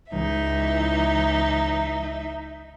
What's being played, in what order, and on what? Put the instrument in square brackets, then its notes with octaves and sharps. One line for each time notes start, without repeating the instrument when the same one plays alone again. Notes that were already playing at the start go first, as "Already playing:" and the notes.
[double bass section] C#2 E3 [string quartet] D#4 E5